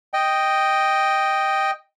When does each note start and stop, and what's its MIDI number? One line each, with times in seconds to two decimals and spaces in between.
0.14 1.71 75
0.14 1.71 79